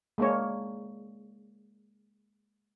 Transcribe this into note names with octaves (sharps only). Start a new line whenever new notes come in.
G#3 A#3 D4 C#5